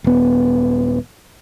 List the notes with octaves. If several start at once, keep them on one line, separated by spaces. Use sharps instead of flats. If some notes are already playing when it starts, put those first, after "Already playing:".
D#1 B3